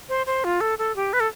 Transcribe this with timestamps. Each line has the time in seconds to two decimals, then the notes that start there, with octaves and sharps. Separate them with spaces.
0.09 C5
0.27 C5
0.44 F4
0.61 A4
0.79 A4
0.96 G4
1.13 B4
1.20 A4